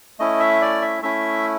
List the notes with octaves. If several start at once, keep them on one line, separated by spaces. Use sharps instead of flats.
A3 C#4 E4 D#5
E5
D5
E5
A3 C#4 E4 E5